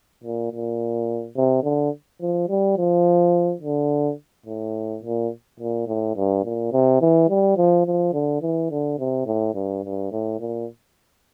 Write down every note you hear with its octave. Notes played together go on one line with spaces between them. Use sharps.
A#2
A#2
C3
D3
F3
G3
F3
D3
A2
A#2
A#2
A2
G2
A#2
C3
E3
G3
F3
F3
D3
E3
D3
C3
A2
G2
G2
A2
A#2